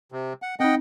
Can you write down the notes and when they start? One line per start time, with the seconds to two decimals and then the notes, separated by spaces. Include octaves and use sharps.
0.12 C3
0.42 F#5
0.60 C4 D#4 D#5 F#5 G5